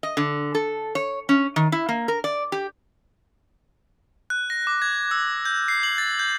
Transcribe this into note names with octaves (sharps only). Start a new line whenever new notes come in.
D#5
D3
A4
C#5
C#4
D#3
E4
A#3
A#4
D5
G4
F#6
A#6
D6
G#6
E6
G6
C7
F#7
A6
G6